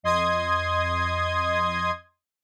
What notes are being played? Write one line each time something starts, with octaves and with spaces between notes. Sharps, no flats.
F2 D#5 C6 D#6 G#6